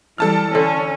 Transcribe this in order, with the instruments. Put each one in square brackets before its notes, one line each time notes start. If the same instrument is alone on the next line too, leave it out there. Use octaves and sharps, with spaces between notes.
[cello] E3 G3 [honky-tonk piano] A4 A5 F6
[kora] D3 [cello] C#4